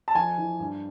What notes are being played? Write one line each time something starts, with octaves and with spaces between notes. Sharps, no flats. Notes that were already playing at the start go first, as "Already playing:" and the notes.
A5
F2 G#5
E3
G2